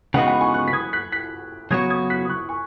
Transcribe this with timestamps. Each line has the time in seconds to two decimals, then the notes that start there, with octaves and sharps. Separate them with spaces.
0.14 C#3 G#3 B3 D#4 F#4 F#5
0.27 F#5 B5
0.41 G#5 C#6
0.54 C#6 F#6
0.68 B6
0.73 D#6 G#6
0.93 F#6 B6
1.12 F#6 B6
1.71 C#3 F#3 B3 F#4 C#5 D#6 G#6
1.90 D#6 G#6
2.10 F#6 B6
2.25 D#6
2.29 C#6 F#6
2.49 G#5 C#6